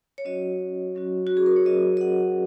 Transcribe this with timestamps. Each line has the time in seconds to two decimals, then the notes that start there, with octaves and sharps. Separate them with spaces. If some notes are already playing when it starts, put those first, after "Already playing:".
0.18 C#5
0.25 F#3 C#4 F#4 D#5
0.95 F#3 C#4 F#4
1.27 F#4
1.37 G#4
1.46 A#4
1.56 C#5
1.66 F#3 C#4 F#4 D#5
1.97 D#5
2.01 F#5